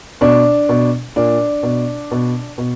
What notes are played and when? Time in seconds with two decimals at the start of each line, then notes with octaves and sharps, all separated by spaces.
0.21 B2 D4
0.69 B2
1.16 A#2 D4
1.63 B2
2.11 B2
2.58 B2